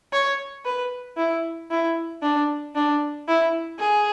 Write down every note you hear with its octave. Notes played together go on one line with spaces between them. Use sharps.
C#5
B4
E4
E4
D4
D4
E4
G#4